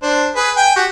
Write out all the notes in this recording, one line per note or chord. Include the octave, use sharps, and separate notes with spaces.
D4 C5
G#4 B4
G5 G#5
F#4 G4